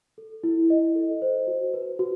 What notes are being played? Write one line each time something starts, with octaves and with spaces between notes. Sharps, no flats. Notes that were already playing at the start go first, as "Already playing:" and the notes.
A4
E4
D#5
A4
C5
F#4
B4
F#4